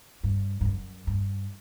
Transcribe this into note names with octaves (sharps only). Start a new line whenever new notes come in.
G2
G2
F#2
G2